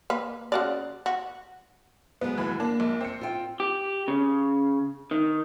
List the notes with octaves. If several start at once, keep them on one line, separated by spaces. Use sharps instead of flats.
A#3 B4
C#3 F#4 D5
F#4
F#3 G#3 B3
D#2 E3 B5
A#3 D4
A#1
C4 C#7
F4 G5
G4
C#3
D#3